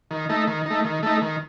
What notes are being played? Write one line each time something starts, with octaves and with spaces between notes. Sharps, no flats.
D#3
A3 D#4
D#3
A3 D#4
D#3
A3 D#4
D#3